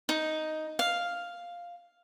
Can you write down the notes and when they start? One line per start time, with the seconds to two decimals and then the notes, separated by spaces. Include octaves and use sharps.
0.09 D#4
0.79 F5